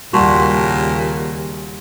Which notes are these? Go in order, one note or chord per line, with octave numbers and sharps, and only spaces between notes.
D#2 A#2 C#3 G3 F#4 A5 C6 C#6